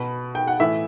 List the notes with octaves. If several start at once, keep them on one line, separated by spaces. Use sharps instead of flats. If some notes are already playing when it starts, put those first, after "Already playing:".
Already playing: B2 B5
G5
F#5
A2 E3 E5